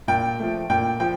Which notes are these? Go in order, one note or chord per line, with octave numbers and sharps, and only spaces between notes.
A#2 G5
F3 A3
A#2 G5
F3 G5